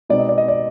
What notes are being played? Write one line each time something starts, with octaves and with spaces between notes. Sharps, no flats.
B2 G#3 C4 D#4 D5
D#5
D5
D#5
D5